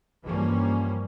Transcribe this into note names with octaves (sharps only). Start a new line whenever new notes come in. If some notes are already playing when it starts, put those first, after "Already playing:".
G2 E3 F3 G3 A#3 C#4